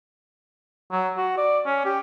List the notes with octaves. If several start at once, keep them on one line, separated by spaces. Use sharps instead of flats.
F#3
F#4
D5
C#4
G4